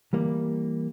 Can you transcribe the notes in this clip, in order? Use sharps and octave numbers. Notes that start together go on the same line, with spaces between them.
E3 G3 A#3